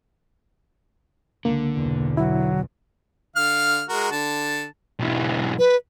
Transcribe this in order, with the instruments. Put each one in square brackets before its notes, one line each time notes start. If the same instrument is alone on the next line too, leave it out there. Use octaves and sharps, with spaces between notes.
[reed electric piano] C#2 A#3 [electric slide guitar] D3
[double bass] B1 E2
[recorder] F#3 [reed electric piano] E4
[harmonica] D3 F5 F6
G#3 F#4 A#4
D3 A5
[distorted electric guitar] B1 E3
[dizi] B4